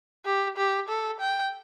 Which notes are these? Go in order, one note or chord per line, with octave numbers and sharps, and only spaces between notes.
G4
G4
A4
G5